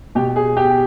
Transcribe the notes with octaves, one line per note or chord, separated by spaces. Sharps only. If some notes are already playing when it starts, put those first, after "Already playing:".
B2 G4
G#4
G4